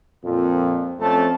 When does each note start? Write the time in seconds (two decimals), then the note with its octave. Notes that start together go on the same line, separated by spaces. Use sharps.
0.23 F2 A#2 F3
1.00 F2 A3 C#4 C5 A5